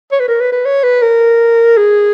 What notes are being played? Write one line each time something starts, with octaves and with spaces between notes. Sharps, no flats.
C#5
B4
A#4
B4
B4
C#5
B4
A#4
G#4